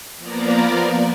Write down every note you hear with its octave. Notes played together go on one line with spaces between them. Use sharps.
F3 A#3 B3 A#4 D5